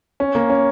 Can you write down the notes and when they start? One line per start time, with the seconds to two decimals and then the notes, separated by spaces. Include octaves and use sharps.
0.20 C#4
0.35 A#3
0.50 C#4